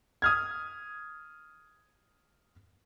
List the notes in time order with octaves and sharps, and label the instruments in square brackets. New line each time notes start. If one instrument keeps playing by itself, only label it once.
[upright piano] D#6 F6 G#6